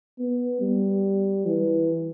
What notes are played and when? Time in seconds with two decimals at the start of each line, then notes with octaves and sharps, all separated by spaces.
0.19 B3
0.61 G3
1.46 E3